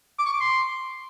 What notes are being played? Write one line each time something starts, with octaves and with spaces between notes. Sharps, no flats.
D6
C#6
D6
C6